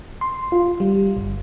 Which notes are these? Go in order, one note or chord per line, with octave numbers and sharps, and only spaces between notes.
C6
F4
G3
G1